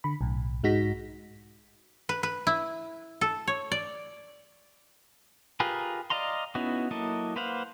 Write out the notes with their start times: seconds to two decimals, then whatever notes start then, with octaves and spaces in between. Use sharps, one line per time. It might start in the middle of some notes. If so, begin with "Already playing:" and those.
0.04 D3 B5
0.21 B1 A2
0.64 G#2 G#3 D#4 F#4 A#6 B6
2.09 B4
2.23 B4
2.47 E4
3.21 A4
3.47 C#5
3.72 D5
5.60 F4 G4 G#4 A#4 B4
6.10 D5 D#5 F5 A#5 C6
6.55 B3 C#4 D#4 E4 F#4
6.91 F#3 A#3 E4 A4 D#5
7.36 A#3 B4 C5 F5 F#5